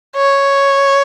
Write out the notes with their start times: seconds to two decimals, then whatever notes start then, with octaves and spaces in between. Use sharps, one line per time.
0.16 C#5